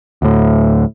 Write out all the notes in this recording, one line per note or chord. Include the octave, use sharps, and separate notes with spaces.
D2 A2